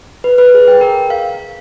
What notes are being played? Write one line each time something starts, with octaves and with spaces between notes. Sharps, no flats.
B4
B4
G#4
G5
A#4
F5